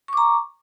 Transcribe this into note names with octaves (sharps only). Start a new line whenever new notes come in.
A#5 C#6 D6